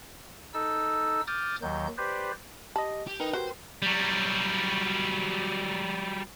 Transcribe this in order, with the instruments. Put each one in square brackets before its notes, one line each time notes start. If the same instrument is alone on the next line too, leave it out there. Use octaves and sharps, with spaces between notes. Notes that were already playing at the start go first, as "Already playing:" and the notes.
[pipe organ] D#4 A4 E6
D6 D#6 F6 G6 A6
D#2 D#3 F#3 G6
G4 B4 C5 D5
[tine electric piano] G4 D#5 [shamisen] A5 B5
[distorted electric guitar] G4
[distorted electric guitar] D#4 [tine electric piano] A#4 B4 G5
[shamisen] F#4 G4 [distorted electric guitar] C5
[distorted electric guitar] F#3 G3